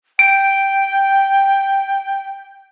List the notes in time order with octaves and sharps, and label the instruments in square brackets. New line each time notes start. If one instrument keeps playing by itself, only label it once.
[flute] G5 [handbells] D7